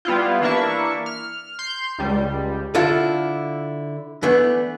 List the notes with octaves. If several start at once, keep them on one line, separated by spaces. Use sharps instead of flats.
G3 B3 E4 F4
E3 A#3 D4 E4 E5 C#6
F6
C6 G6
C#2 G3
D3 E4 F4 A4
E3 A3 B3 D4